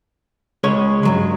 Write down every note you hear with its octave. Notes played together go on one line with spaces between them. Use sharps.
C#2 G#3 C#4 C#5
G2 F#3 G#3